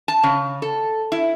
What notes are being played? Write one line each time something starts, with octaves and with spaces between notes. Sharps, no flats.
A5
C#3
A4
E4